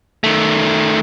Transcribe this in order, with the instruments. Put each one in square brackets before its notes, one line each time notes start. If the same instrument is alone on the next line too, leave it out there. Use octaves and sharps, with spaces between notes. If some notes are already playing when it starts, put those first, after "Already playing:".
[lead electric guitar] D#3 A3